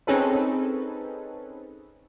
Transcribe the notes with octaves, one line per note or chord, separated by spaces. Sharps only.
C4 C#4 D#4 G#4 A4 B4